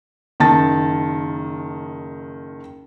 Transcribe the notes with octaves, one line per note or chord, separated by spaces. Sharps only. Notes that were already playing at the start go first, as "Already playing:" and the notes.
F#1 D#3 A5 A6